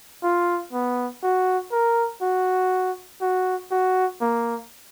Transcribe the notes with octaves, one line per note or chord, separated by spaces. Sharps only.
F4
B3
F#4
A#4
F#4
F#4
F#4
A#3